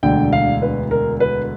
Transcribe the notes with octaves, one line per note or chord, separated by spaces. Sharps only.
E1 D2 D3 G5
F5
B4
A#4
B4